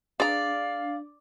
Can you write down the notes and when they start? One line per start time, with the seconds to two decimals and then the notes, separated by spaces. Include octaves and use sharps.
0.20 D4 G#4 D5 F5 A#5